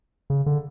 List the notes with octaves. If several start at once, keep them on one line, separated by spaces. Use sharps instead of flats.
C#3
D3